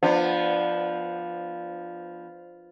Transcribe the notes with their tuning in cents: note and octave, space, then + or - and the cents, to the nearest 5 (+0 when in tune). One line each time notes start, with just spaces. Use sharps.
F3 +0 B3 -10 D4 +25